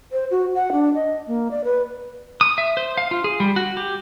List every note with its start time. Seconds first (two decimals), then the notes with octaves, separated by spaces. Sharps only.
0.12 C5
0.31 F#4
0.54 F#5
0.72 D4
0.94 D#5
1.27 A#3
1.51 D5
1.64 B4
2.41 D#6
2.58 E5
2.77 C5
2.97 F5
3.11 F4
3.24 G#4
3.40 G3
3.56 F#4
3.77 G4